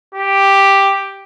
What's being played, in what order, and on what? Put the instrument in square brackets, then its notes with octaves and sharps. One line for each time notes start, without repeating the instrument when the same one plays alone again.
[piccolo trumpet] G4